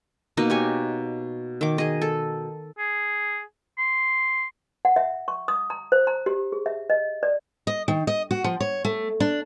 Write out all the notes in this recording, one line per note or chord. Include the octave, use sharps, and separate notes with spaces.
B2 A#3 D#4 D#5
G4 C#5 G#5
D#3 D6
G#4 D#5
A4
G#4
C6
F#5
E5
C#6
D#6
A#5
C5
A#5
G4
G#4
E5
D#5
D5
D#5
D#3
D#5
F#4
F3
C#5
A3
D4